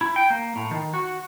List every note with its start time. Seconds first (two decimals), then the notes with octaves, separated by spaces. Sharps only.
0.01 E4
0.16 G5
0.30 A#3
0.56 A2
0.71 D#3
0.94 F#4